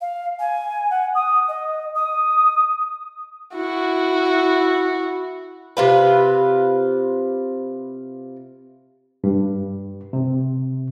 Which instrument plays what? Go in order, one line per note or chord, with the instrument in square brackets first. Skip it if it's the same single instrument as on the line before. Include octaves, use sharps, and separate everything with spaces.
[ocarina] F5
G#5
F#5
D#6
D#5
D#6
[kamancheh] E4 F#4
[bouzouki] C3 F4 B4
[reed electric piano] G2
C3